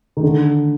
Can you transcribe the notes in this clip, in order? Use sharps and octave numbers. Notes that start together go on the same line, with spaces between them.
D#3
D3